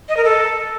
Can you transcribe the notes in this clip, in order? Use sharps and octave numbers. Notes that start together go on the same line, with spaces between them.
D#5
A#4
A4